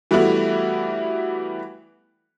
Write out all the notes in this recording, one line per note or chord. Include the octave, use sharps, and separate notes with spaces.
E3 G3 A3 B3 E4 F#4